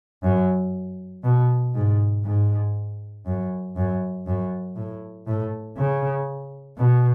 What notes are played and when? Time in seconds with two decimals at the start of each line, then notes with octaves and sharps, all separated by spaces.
0.23 F#2
1.24 B2
1.75 G#2
2.25 G#2
3.26 F#2
3.76 F#2
4.27 F#2
4.76 A2
5.27 A2
5.77 C#3
6.78 B2